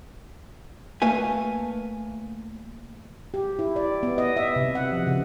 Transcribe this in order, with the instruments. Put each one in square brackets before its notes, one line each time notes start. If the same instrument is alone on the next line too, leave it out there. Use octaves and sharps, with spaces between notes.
[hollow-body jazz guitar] A3 A#3 B4 G#5
[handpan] G4
E4
D5
B3
D#5
E5
C3
F#5
F3
C#3